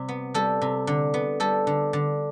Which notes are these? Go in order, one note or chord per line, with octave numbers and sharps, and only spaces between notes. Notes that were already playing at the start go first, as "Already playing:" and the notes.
Already playing: C3 G3
B3
G3 A4
C3
D3
B3
G3 A4
D3
D3